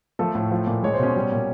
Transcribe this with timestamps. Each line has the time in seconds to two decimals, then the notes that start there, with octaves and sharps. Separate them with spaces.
0.19 F3 A3 A4
0.35 A2
0.51 F3
0.67 A#2
0.83 G#3 C#5
0.94 C5
0.99 B2 C#4 C#5
1.16 G3
1.32 A#2